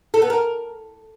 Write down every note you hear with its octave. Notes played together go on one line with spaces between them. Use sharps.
A4
B3
A#4